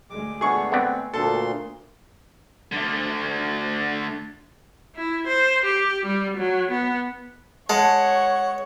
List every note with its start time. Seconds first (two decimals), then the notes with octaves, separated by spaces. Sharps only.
0.10 D2 G#3 D6
0.41 A3 B3 D4 G#4 C#6
0.72 A3 B3 C4 D5
1.14 D2 A#2 A#3 A4 C6
2.72 D3 A3
4.94 E4
5.26 C5
5.64 G4
6.05 G3
6.36 F#3
6.69 B3
7.70 G#3 C#5 F#5 A5